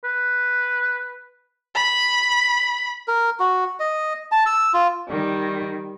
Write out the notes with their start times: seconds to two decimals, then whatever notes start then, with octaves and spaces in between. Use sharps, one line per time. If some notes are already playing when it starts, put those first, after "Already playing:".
0.04 B4
1.75 B5
3.08 A#4
3.40 F#4
3.80 D#5
4.32 A5
4.46 E6
4.73 F4
5.09 D#3 G3